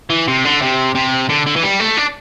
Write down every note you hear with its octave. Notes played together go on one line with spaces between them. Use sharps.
E3
C3
D3
C3
C3
D3
D3
E3
G3
A3
D4